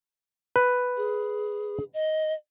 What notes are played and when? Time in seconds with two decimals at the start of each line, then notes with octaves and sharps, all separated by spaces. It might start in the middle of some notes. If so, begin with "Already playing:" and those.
0.56 B4
0.97 G#4
1.94 D#5